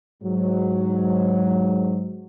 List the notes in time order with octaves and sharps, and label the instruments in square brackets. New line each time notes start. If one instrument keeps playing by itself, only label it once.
[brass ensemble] G#2 F#3